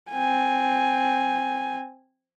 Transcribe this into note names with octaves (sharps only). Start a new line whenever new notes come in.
C4 G#5